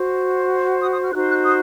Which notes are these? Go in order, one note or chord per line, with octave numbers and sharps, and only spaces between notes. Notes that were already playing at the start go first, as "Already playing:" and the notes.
Already playing: F#4 C5
D#6
D#6
F6
D#4 F#4 C5 F#6
F#6
D#6